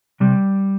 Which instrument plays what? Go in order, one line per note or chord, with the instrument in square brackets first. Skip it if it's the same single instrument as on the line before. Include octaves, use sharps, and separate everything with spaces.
[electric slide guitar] C3 G3